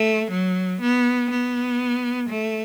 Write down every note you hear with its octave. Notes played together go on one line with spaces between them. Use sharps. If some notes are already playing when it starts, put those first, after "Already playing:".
Already playing: A3
F#3
B3
B3
A3